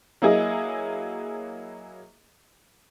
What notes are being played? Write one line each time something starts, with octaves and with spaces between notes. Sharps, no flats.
F#3 A#3 E4 G#4 D#5